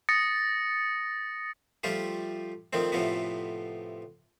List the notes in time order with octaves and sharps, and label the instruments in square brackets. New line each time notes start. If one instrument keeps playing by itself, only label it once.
[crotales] D#6 A6 A#6 C#7
[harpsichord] F3 G3 A3 F4 G4
D#3 F3 A3 C4
A2 C3 F3 A3 B3